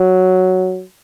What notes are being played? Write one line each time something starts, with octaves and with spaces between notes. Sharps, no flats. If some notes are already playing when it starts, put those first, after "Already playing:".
Already playing: F#3